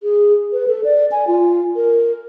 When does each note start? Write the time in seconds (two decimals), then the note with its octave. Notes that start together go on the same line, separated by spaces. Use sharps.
0.03 G#4
0.53 B4
0.68 A4
0.84 D5
1.12 G#5
1.27 F4
1.76 A#4